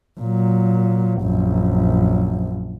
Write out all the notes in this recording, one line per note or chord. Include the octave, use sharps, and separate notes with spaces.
A#2 F#3
A#1 F#2